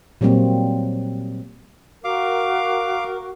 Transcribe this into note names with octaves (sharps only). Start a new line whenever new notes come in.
A#2 F#3 G3 A#3 C4
F#4 A#4 F5 D6